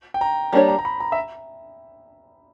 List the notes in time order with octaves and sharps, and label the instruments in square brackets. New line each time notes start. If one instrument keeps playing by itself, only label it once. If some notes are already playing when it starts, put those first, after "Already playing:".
[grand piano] G5
A#5
[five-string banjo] G3 A#3 D4 G4 C#5 [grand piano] A#5
[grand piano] A#5
A#5
B5
A#5
E5